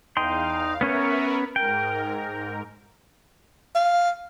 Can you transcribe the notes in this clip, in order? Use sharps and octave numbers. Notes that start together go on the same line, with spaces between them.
E2 D#4 F5 G5 C6
B3 C#4 A#4 B4 C#5 E5
G#2 A#4 G5
F5